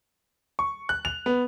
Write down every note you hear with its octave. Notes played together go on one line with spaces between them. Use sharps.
C#6
F#6
F7
B3